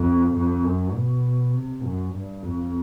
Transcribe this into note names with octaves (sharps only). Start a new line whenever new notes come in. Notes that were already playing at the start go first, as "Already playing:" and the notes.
Already playing: F2
F2
F#2
B2
C3
F#2
G2
F2